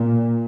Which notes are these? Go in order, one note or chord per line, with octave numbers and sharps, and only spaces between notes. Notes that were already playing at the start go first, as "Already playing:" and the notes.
Already playing: A#2